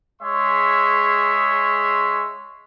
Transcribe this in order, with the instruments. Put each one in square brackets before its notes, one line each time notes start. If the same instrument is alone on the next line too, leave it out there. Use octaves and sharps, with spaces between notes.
[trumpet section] G#3 G#4 C#5 E5 C6